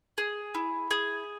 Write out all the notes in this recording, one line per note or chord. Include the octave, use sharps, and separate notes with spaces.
G#4
E4
G#4